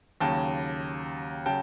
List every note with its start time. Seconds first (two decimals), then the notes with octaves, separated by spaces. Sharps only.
0.20 D#2 C#3 F#3 G5 A5
1.46 C#3 F#3 G5 A5